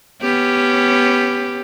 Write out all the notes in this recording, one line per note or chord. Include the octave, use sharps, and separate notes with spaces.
B3 C#4 G4